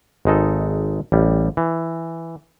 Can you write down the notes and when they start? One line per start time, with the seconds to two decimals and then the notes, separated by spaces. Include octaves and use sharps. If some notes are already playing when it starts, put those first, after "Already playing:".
0.25 G#1 G#3 D#4 A4
1.12 A1 G3
1.57 E3